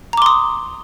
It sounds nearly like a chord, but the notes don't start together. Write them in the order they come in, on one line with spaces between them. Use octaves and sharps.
A#5 D6 C6 D#6